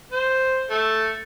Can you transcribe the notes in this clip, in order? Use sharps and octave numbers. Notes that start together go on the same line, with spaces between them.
C5
A3 A4